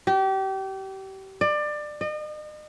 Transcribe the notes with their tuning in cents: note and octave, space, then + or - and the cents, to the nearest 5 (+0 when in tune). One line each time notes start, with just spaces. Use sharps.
G4 -30
D5 +25
D#5 -40